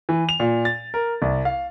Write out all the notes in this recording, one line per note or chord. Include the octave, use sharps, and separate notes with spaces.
E3
F7
A#2
A6
A#4
C2
F5